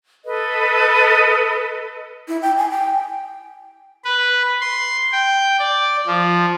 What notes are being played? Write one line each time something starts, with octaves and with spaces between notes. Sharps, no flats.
A4 B4 D#5
E4
G5
G#5
G5
B4
C6
G5
D5
F3